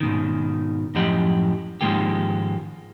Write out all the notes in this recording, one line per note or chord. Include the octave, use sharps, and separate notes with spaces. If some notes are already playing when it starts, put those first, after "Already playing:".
G#2 B2 D#3
F#2 A2 F3 G4 D#5 F#5
G#2 D#3 F3 G#3 A#3 G4